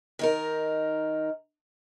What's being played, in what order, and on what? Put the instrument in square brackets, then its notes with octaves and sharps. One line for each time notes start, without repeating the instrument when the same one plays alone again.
[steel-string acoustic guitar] D#3 D#4 A#4